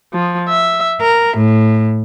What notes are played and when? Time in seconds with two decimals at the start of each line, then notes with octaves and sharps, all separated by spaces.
0.13 F3
0.49 E5
1.00 A#4
1.36 A2